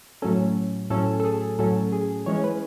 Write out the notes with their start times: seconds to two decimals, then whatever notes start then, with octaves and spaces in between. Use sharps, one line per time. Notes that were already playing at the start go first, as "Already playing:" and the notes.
0.22 A2 F#3 C#4 A4
0.90 A2 F#3 C#4 A4
1.20 A4
1.25 G#4
1.59 A2 F#3 C#4 A4
1.92 G#4
2.26 E3 G#3 C#4 C#5
2.44 B4